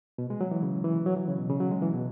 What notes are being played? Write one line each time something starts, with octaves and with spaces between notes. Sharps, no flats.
B2
G#3
F#3
E3
C#3
E3
F#3
E3
C#3
B2
C#3
F#3
G#3
E3
B2